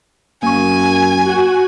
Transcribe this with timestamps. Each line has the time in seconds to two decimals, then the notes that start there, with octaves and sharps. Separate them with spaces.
0.43 F#2 A#3 G#5 C#6
1.24 F#4